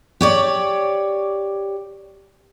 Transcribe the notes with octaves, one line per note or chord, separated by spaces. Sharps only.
G4 C#5 D5